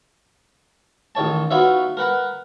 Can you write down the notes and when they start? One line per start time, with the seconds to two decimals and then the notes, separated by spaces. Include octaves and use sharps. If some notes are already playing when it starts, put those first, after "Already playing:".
1.15 A1 D#3 C#5 A5
1.51 B3 D#4 F4 F#4 C#5 E5
1.97 A#4 B4 F#5 A#5